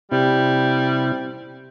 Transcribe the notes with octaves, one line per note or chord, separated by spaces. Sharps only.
C3 G3 C4 E4